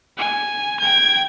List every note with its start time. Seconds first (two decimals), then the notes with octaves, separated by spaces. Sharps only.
0.18 G#5
0.80 G5 G#6